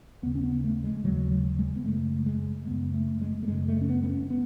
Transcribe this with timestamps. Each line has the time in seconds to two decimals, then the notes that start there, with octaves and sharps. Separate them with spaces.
0.22 D#2 C#3 B3
0.35 C#4
0.43 B3
0.64 A3
0.84 G#3
1.04 D#2 C#3 F#3
1.31 F#3
1.59 G#3
1.76 B3
1.85 F#2 C#3 A3
2.26 G#3
2.67 F#2 C#3 B3
2.94 A3
3.21 G#3
3.43 A3
3.48 F#2 C#3 G#3
3.68 A3
3.81 C#4
3.89 B3
4.04 B3
4.09 C#4
4.30 B3